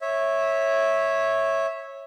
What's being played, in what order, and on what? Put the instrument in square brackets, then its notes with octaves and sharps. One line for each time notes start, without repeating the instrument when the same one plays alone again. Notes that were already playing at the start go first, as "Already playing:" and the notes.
[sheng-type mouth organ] C#5 E5